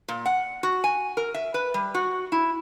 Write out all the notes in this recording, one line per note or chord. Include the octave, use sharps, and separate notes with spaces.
A#2
F#5
F#4
G#5
A#4
E5
B4
G3
F#4
E4